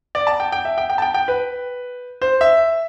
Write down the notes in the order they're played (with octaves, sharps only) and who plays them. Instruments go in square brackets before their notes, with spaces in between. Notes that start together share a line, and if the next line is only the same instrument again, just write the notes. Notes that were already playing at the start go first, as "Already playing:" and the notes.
[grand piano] D5
A5
G5
G5
E5
G5
G5
A5
G5
G5
B4
C5
E5